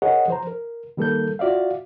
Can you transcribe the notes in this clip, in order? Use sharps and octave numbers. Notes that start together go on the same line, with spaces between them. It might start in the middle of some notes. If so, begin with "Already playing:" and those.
G#4 A#4 C#5 D#5 F#5
F3 C5 A#5
A#4
D#3 G3 A#3 A4 A#4 G6
F4 F#4 D5 E5 F5